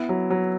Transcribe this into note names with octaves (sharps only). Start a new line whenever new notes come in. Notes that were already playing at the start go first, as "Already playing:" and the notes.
Already playing: B3 E4
F#3
F#3